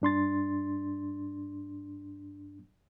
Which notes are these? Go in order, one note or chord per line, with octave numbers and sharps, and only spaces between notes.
G2 D4 C6 A6